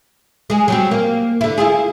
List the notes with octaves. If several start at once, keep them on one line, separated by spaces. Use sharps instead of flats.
G#3 G#4
F#3 G3 C4
A#3
D3 E4
E4 F4 G#4